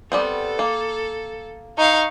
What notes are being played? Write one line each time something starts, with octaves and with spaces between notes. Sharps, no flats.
G3 B3 C4 A4
A#3
D#4 F5 C#6